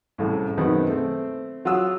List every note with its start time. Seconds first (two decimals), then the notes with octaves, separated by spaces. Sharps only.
0.18 C2 A2 C#3
0.57 F#2 B2 D#3 G#3 B3 C4
0.89 A3 C4
1.65 F#3 F4 F#4 F#5 D#6 E6